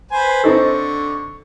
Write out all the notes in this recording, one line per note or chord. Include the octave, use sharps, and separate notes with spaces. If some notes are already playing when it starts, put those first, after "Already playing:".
B4 C5 G#5
D3 C4 D#4 A4 C#6